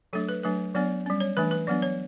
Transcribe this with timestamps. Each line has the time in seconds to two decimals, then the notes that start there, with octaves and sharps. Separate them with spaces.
0.13 F#3 A3 D4 A4
0.29 B4
0.43 F#3 A3 D4 B4
0.75 F#3 B3 D4 D5
1.06 G3 C#4
1.20 C#5
1.37 E3 A3 D4 B4
1.51 B4
1.67 F#3 B3 D4 D5
1.82 C#5